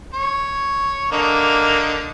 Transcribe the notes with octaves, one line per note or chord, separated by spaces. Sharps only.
C#5
D3 A#3 D#4